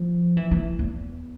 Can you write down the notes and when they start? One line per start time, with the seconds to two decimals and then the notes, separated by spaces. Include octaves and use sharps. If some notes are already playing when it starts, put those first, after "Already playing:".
Already playing: F3
0.37 E3
0.51 E3
0.79 E2